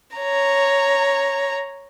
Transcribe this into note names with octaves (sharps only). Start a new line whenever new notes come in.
C#5 A#5